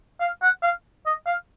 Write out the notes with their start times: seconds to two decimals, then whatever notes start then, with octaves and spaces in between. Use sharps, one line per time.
0.21 F5
0.42 F#5
0.63 F5
1.06 D#5
1.26 F5